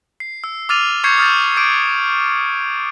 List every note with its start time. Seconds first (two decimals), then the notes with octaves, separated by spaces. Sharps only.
0.20 C7
0.44 E6
0.69 D6 E6 F6 A6 D#7 F7
1.04 C#6 F6 G6 G#6 C7 C#7
1.18 D#6 F6 G6 A6
1.57 D6 E6 G6 D7